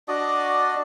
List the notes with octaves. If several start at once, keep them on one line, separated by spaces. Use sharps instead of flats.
D4 F#4 D5 D#5